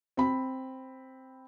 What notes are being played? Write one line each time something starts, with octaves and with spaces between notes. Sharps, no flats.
C4 B5